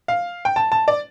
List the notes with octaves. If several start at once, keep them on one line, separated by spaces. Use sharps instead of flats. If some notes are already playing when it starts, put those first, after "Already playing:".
F5
G5
A5
A5
D5